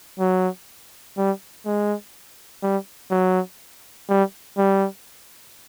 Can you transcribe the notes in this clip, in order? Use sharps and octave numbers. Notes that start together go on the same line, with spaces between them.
F#3
G3
G#3
G3
F#3
G3
G3